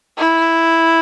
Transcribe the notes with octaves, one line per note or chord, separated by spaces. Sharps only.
E4